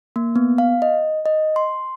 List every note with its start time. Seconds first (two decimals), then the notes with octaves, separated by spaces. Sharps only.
0.16 A#3
0.36 B3
0.58 F5
0.82 D#5
1.26 D#5
1.56 C6